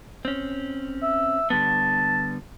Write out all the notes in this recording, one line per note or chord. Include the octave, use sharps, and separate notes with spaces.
C4 C#4
E5
D3 G3 B3 A5